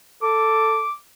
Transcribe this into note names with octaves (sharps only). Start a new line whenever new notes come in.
A4 D6